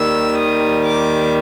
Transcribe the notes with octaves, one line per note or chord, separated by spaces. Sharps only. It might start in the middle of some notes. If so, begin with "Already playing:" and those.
Already playing: D#2 D#3 G3 E6
D#6
D6